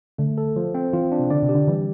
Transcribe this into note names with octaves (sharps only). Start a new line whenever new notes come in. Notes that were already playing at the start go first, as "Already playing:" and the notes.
D3 A3
A4
F3
C4
E3 F4
D4
C3
D3 D5
C3
G4
D3
E3 G3